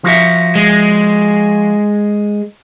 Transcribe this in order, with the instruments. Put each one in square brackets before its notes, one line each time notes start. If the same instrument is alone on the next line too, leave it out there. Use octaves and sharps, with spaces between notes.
[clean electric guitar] F3 F#4 E5
[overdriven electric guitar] G#3